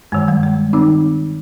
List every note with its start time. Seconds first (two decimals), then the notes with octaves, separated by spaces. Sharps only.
0.12 G2 D#3 G#3
0.28 G3
0.43 G#3
0.73 D#3 C4 D#4